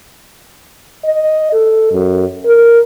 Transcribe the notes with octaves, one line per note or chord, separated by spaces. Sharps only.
D#5
A4
F#2
A#4